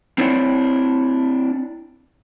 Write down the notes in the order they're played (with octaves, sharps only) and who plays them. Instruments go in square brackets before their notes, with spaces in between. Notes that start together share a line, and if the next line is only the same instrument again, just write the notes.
[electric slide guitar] C4 D4 E4 C#5